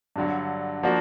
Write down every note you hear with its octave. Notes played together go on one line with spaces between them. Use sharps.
G2 D3 F#3
F3 A#3 D4 F#4